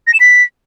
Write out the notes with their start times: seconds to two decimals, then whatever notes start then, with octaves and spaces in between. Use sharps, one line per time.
0.07 A#6
0.14 E7
0.20 B6